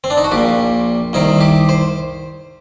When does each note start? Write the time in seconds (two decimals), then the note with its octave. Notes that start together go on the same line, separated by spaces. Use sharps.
0.04 C4
0.10 D4
0.18 D#4
0.24 F#4
0.32 A#1 A#2 G4
1.13 C2 C3 D#3 D#4
1.41 G4
1.69 C5